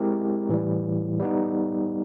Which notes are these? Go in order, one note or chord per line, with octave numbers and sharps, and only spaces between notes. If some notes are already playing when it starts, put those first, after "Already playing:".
Already playing: G#3 C4 E4 G4 A#4
A2 E3 G3
G3 B3 D#4